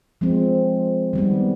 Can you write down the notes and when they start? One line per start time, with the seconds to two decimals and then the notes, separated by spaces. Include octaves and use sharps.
0.21 F3 G#3 C4
1.13 D#3 G3 B3